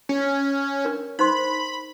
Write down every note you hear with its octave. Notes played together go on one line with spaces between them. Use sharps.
C#4
D4 A#4
D#4 C5 B5 C6